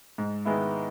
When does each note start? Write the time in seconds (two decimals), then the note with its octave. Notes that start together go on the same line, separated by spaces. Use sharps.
0.18 G#2
0.45 D#3 G#3 B3 E4